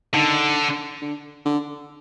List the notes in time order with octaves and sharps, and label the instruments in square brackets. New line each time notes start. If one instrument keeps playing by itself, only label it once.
[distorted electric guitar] D3 [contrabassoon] D#3
[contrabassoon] D3
D3